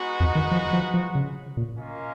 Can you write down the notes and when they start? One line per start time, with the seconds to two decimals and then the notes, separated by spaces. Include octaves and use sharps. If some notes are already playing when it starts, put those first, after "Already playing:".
Already playing: G#3 B3 D#4 F#4
0.20 F2
0.35 D#3
0.52 F3
0.73 F3
0.94 F3
1.15 C#3
1.57 A#2
1.78 A#3 C#4 F4 A#4 D#5